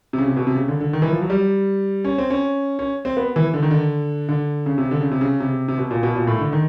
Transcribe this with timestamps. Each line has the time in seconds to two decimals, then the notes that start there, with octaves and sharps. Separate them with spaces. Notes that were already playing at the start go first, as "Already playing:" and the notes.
0.13 C3
0.18 C#3
0.28 C3
0.36 B2
0.47 C3
0.55 C#3
0.68 D3
0.81 D3
0.93 D#3
1.02 E3
1.12 F3
1.21 F#3
1.30 G3
2.05 C#4
2.18 C4
2.30 C#4
2.79 C#4
3.05 C4
3.17 B3
3.36 E3
3.54 D3
3.63 D#3
3.71 D3
4.29 D3
4.66 C#3
4.78 C3
4.91 D3
5.01 C#3
5.11 C3
5.21 C#3
5.40 C3
5.68 C3
5.78 B2
5.91 A#2
6.03 B2
6.15 A#2
6.27 A2
6.40 D3
6.52 D#3